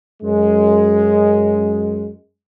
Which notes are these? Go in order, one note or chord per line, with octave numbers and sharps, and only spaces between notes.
F#2 G#3